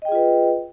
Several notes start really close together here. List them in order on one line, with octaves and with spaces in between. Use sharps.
D#5 G5 G#4 F4 B4